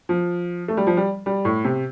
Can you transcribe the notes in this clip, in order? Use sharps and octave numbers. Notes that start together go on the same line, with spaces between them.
F3
A3
G3
F3
G3
G3
A2
C3